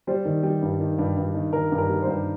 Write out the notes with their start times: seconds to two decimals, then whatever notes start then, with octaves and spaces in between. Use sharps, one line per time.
0.07 G3 C5
0.25 D#3
0.43 G3
0.62 G2
0.80 D#3
0.98 G2
1.17 G2
1.34 D#3
1.53 D#3 A#4
1.72 G2
1.78 A#4
1.89 G3
2.02 G2 C5